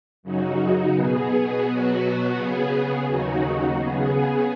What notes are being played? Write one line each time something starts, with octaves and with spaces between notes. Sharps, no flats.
F#2 C#3 F#3 D#4 F#4
B2 B3 G#4
B2 F#3 B3 F#4
C#3 B3 G#4
D#2 C#3 F#3 D#4 F#4
C#3 B3 G#4